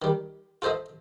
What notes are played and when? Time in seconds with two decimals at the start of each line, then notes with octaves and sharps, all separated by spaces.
0.02 D#3 G3
0.62 F4 A4 C5 D#5 E5